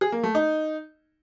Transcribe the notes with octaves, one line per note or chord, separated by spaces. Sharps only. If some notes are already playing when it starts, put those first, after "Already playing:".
G#4
A#3
A3
D#4